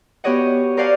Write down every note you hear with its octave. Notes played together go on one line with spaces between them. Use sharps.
B3 F#4 G4 C#5 D#5 F#5
A#4 C5 D5 F5 F#5 G#5